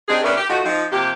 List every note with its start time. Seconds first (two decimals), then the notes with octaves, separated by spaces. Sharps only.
0.09 C4 D4 D#4 G4 G#4
0.23 C#3 B3 C#4 D4 A#4 E5
0.36 G4
0.49 F3 A3 D#4 F#4
0.64 F3 C4 D#4
0.92 C3 F3 A#3 G4